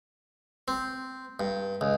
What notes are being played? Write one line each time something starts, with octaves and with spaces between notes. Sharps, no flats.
C4
G2
C#2